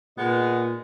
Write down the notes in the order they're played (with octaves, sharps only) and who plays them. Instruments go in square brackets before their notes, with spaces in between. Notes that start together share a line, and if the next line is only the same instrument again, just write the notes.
[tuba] A#2 [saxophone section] G#3 B3 D#4